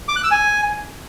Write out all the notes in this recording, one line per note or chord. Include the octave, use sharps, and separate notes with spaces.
D6
F#6
E6
G#5